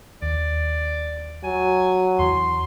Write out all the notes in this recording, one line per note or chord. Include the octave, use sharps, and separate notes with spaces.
D#2 D5
F#3 G#5
E2 E3 C6